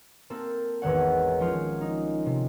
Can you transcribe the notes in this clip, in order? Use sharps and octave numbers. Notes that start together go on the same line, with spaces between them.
A#3 C4 A4
G#1 E2 D#3 C#5 F#5
F3 C#4 F4
D#4
C3